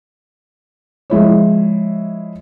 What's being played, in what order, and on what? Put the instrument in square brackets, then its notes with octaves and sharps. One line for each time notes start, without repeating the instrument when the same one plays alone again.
[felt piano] F3 G#3 E4 C#5